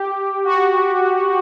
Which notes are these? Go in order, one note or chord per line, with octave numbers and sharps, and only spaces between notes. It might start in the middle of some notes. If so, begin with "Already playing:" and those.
Already playing: G4
F#4